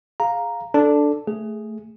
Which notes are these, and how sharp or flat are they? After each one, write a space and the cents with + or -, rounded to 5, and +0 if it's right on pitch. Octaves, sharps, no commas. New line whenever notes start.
G#4 +0 F5 +10 A#5 +0
D4 +0 A4 +0
A3 +0 G#4 +0